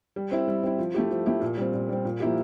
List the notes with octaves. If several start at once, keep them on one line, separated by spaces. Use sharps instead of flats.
G3
C4 E4
G3
C4 E4
F3
A3 E4 G4
F3
A3 E4 G4
A#2
G3 C4
A#2
G3 C4
A#2
F3 A#3 E4 G4